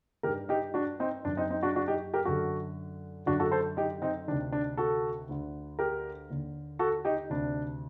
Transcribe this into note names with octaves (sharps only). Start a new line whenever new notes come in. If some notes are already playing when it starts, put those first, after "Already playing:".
G2 D#3 G4 A#4
D#4 G4
D4 F#4
C4 D#4
F#2 D#3 D4
C4 D#4
C4 D#4
D4 F#4
D4 F#4
D#4 G4
G4 A#4
F#2 D3 F#4 A4
F#2 D3 D4 F#4
F#4 A4
A4 C5
D#4 G4
C4 D#4
D2 C3 D#3 D4
D4
F#4 A4
D2 D3
G4 A#4
D#2 D3
F#4 A4
D#4 G4
D2 C3 D#3 D4